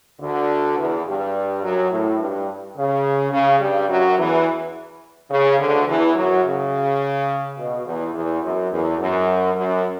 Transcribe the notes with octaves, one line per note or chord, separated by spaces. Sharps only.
D2 D3
E2 E3
G2 G3
F#2 F#3
A2
G2
C#3
C#3
G2 G3
F#2 F#3
E2 E3
C#3
D2 D3
E2 E3
F#2 F#3
C#3
B2
E2
E2
F#2
E2
F#2
F#2